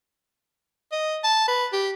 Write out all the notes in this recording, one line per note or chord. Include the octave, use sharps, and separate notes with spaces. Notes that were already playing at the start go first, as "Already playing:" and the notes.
D#5
A5
B4
G4